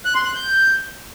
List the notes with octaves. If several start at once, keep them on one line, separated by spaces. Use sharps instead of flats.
F#6
C6
F#6
G6